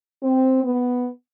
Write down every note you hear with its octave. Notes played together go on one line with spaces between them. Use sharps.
C4
B3